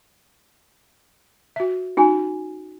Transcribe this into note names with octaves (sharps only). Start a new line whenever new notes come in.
F#4 E5
C#4 D#4 F#4 G#5